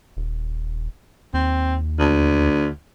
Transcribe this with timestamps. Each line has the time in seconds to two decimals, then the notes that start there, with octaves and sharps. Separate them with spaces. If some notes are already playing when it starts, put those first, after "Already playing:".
0.17 D#1
1.34 D#2 C4
1.99 D2